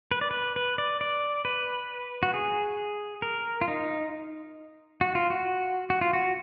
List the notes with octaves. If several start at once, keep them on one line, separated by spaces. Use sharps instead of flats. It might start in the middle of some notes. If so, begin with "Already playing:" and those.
B4
D5
B4
B4
D5
D5
B4
F#4
G#4
A#4
F4
D#4
F#4
F4
F#4
F#4
F4
F#4